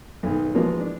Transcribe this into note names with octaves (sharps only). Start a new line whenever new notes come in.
B1 G#2 D#3
E3 F3 G#3 A#3 B3 F#4
D4